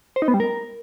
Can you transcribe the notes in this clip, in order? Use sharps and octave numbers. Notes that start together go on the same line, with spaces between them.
C5
D#4
B3
G3
A#4